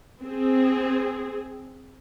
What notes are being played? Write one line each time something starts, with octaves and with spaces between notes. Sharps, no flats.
C4 G#4